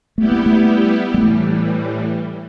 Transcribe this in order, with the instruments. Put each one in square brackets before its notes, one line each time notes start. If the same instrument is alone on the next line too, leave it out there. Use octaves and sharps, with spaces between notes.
[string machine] G3 B3 E4 G4 [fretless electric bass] A3
[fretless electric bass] A#3
A3
G#3
[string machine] A2 E3 G3 [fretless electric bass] A3